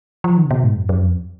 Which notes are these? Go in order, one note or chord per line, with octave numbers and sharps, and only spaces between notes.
F3
D#3
C#3
B2
G#2
F#2
F#2
F2